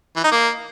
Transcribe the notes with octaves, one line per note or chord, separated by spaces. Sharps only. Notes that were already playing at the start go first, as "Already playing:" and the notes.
E3
D#4
A#3